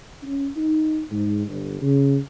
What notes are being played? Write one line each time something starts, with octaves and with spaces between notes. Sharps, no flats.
C#4
D#4
G#2
G1
C#3